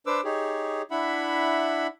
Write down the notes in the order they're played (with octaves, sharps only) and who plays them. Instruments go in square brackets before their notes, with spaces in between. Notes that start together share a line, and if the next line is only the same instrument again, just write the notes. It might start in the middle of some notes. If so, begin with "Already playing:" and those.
[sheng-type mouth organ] D4 B4 C5 D6 E6
D#4 G4 G#4 C#5
D4 E4 E5 F#5 B5